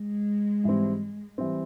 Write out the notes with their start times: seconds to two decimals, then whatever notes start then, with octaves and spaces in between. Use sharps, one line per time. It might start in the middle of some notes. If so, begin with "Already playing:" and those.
Already playing: G#3
0.64 G#2 E3 G3 C4
1.38 E3 G3 C4